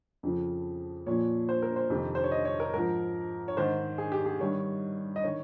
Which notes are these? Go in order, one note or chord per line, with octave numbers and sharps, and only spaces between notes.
F2 C#3 F3
A#2 F3 C#5
C5
A#4
C5
F2 C3 D#3
C5
C#5
D#5
C#5
A#4
G#2 F3 A#4
C#5
G#2 D#3 C5
G#4
G4
G#4
G2 D#3 C#5
D#5
D#3 C#5